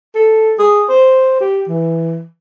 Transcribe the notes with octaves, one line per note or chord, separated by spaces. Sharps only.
A4
G#4
C5
G4
E3